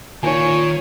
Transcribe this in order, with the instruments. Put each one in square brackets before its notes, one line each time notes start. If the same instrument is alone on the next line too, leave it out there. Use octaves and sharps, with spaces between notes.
[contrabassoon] A#2 [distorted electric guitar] D#3 [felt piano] F4 G#5 [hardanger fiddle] C#5